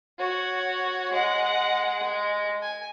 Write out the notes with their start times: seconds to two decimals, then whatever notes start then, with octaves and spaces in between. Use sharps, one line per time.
0.19 F#4 C#5
1.12 G#3 F#5
2.03 G#3
2.62 G#5